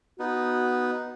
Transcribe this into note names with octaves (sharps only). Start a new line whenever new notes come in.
B3 D#4 F#4